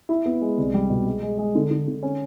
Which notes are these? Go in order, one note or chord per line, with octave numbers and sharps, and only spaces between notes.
E4
B3
G#3
C2
G3
B2
G#3
G#3
G#3
D3
D3
D3
C#4